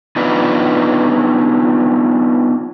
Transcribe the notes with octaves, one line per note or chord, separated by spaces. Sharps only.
B3 D4 D#4 F4 B4